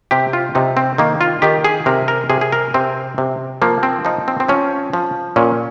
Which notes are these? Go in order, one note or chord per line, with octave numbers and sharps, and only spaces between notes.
C3 G4
F4
C3 D#4
C4
D#3 A#3
F4
D#3 G4
G#4
C3 A#4
A#4
C3 G#4
G#4
A#4
C3 C4
C3
F3 A#3
C4
F3 D#4
C4
C4
F3 C#4
F3
A#2 C#4